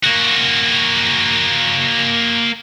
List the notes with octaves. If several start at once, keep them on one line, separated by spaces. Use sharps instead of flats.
A#3 F#4